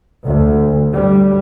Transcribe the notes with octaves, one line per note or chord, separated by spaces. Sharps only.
D2
G3